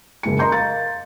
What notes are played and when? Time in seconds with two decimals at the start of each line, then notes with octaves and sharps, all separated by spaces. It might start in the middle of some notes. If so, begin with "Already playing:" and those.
0.23 F#1 G#3 C#7
0.39 A#4 D#5 A#5 C6 G6
0.52 F5 G6 A6